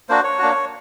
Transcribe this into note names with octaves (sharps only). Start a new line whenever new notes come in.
A#3 D4 F#4 C5
C#5
A#3 D4 F#4